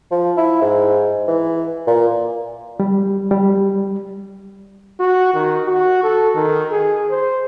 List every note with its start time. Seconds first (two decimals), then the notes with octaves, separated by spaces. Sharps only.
0.11 F3
0.37 E4
0.61 G#2
1.27 E3
1.87 A#2
2.80 G3
3.31 G3
5.00 F#4
5.34 D#3
5.66 F#4
6.04 A4
6.35 D#3
6.71 G#4
7.11 C5